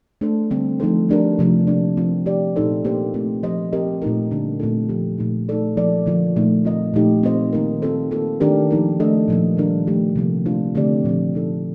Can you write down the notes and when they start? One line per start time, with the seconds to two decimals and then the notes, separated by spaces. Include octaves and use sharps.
0.21 A3 D4 A4 C5
0.51 D3 G3 C4
0.80 F3 A3 D#4 A4 C5
1.09 F3 A3 D4 G4 A#4
1.39 C3 F3 A3 D4
1.67 F3 A#3 D4
1.97 F3 C4 F4
2.26 A3 D4 G4 D5
2.56 A#2 A3 D#4 A4 C5
2.85 A#3 D4 G4 C5
3.14 A3 C4 F4
3.43 F3 C4 G4 C5 D#5
3.73 C4 G4 A#4 D#5
4.02 A#2 A3 D#4 A#4
4.31 D3 G3 A#3 D4
4.60 A#2 A3 C4 F4 A4
4.89 F3 C4 G4
5.18 A#2 A3 D#4
5.49 A3 D#4 A4 D5
5.77 F3 A#3 D#4 A4 D5
6.06 D3 F3 A#3 F4
6.36 A#2 A3 D#4
6.65 C4 F4 A#4 D#5
6.94 A#2 F3 A3 D#4 G4
7.23 C4 F4 C5 D#5
7.53 D#3 A#3 D#4 A#4
7.82 C4 F4 A4 C5
8.11 A#3 F4 A4
8.40 D#3 A3 D4 G4 A#4
8.71 F3 A#3 D#4 A#4
9.00 A3 D4 A4 D#5
9.28 A#2 F3 A#3
9.57 D#3 G3 D4 F4 A#4
9.87 F3 A3 D4 G4
10.16 C3 F3 A#3 F4
10.45 F3 A3 D4 F4 C5
10.75 D3 A3 C4 G4 D5
11.04 A#2 F3 C4
11.34 A3 D#4 A4